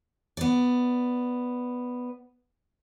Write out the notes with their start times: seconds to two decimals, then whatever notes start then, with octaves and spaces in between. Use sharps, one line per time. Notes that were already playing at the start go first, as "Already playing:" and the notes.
0.37 B3 D5